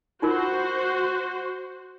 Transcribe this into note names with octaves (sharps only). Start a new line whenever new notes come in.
D#4 F4 F#4 A#4 C5